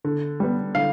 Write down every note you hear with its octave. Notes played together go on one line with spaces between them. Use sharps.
D3
G3 B3
D3 F5